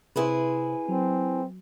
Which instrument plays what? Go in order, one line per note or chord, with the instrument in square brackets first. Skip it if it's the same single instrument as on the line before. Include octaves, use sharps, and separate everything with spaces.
[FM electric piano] C3 C5 [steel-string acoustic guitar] E4 G#4 B4
[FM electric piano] F#3 [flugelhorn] C4